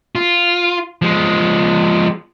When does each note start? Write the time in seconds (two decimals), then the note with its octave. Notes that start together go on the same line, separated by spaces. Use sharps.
0.15 F4
1.02 F3 G#3